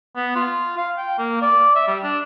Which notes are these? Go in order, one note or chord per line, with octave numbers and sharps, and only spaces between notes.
B3
F4
F5
G5
A#3
D5
E5
G3
D4